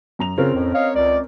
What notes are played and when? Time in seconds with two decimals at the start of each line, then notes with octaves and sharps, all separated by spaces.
0.19 F#2 A#5 F7
0.38 C#3 C4 C#4 F4 A#4
0.54 F2 A2
0.74 C#5 D#5 F5
0.96 C#2 D5